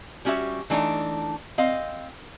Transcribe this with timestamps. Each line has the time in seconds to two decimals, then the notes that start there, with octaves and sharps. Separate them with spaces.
0.25 G3 C#4 F#4 G4 E5
0.70 E3 A3 D4 D#4
1.58 C4 D#5 F5